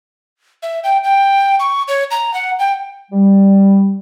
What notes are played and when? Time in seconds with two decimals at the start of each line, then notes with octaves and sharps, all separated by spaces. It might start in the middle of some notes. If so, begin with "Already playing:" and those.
0.63 E5
0.84 G5
1.04 G5
1.60 C#6
1.88 C#5
2.11 A#5
2.34 F#5
2.59 G5
3.11 G3